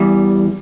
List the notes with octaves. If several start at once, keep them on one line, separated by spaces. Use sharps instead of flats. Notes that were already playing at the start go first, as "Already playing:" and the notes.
Already playing: E2 E3 G3